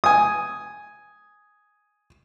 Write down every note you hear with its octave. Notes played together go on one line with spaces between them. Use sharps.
G#5 D#6